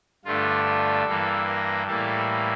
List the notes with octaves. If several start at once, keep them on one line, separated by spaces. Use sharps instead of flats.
G2 D3 A3 F4
F4
G2 E3 A#3 A4
A#4
A2 E3 G3 A#3 A4